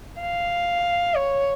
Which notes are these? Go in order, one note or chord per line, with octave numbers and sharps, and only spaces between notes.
F5
C#5